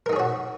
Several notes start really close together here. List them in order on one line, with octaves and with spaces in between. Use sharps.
A#4 D#4 G#4 C#5 F#4